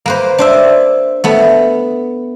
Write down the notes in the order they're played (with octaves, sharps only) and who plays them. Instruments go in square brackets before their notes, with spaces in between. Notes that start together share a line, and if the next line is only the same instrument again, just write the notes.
[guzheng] A#3 B4 C5
D4 C5 E5
A3 B3